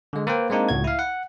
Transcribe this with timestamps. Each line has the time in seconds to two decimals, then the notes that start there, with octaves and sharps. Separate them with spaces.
0.13 D3 G#3
0.27 A#3 B4 C5 G5
0.50 G#3 A#3 C4 D4 D#4
0.69 C#2 A2 F#4 G#6
0.84 E4 F5
0.99 F#5